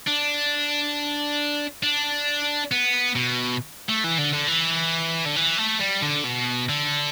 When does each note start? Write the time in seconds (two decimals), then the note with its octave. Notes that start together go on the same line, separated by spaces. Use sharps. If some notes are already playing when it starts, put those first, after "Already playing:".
0.07 D4
1.83 D4
2.71 B3
3.16 B2
3.89 A3
4.04 E3
4.18 D3
4.33 D3
4.48 E3
5.26 D3
5.36 E3
5.58 A3
5.80 G3
6.03 D3
6.25 B2
6.69 D3